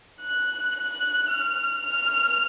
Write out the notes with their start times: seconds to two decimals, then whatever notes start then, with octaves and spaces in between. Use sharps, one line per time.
0.20 F#6
0.75 F#6
1.30 F6
1.85 F6